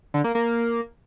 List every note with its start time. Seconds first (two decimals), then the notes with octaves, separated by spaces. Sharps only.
0.14 D3
0.24 A#3
0.35 A#3